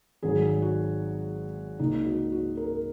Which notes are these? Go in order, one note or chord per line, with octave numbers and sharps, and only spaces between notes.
G#1 G#2 F#3 G#4
F#4
C#2 C#3 A#3 D#4
F#4
F#4
A#4